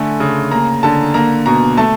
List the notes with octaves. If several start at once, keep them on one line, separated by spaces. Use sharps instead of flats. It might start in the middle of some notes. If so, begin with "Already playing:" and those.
Already playing: D3 A3 G#5
C#3
A#3 A#5
D3 A5
A#3 A#5
B2 A#5
A3 A5